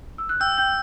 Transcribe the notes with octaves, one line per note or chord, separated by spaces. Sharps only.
E6
F#6
G5 E6 G6
G5 G6